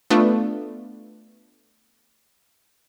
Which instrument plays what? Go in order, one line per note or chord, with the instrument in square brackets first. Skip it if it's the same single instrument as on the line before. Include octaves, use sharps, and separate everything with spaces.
[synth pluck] A3 B3 D4 F4